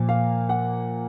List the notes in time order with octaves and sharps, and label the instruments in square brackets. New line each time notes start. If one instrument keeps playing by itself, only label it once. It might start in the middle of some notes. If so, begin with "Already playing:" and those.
Already playing: [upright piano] A#2 F3 A#3
F5
F#5